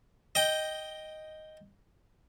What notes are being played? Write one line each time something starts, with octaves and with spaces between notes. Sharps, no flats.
D#5 G5